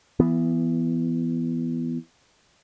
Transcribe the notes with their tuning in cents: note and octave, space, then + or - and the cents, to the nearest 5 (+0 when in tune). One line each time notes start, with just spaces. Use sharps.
E3 +25 B3 +0